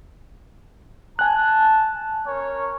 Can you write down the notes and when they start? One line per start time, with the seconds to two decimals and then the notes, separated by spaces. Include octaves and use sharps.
1.19 G#5 A5 F#6
2.26 C#4 A#4 C#5